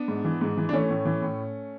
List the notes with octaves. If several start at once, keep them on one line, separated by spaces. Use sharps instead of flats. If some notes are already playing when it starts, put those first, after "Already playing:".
Already playing: B3 D4
G#2
E3
G#2
E3
D4
E3 A3 C#4
A2
E3
A2